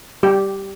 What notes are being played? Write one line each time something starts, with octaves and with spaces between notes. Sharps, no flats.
G3 G4